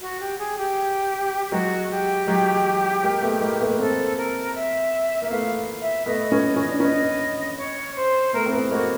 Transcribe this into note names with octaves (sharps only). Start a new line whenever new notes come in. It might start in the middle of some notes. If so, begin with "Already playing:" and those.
F#4
G4
G#4
G4
F#3 G#3 F#4
G4
F#3 G#3
G#3 A#3
A3 B3
G#3 A#3
A3 B3
B3
A#3 C4 A4
A#4
E5
A#3 E5
A3 B3 F5
E5
A3 B3 D#5
B3 C#4
C#4
D4
B3 C#4 D#5
C#5
C5
A3 B3 A#4
C4
A3 B3
G#3 A#3 F#4